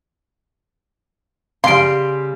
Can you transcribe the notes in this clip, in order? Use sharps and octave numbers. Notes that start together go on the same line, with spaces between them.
C#3 G3 F5 C6 D7